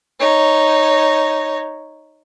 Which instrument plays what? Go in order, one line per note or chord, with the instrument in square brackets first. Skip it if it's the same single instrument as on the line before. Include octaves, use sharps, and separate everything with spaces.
[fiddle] D#4 C#5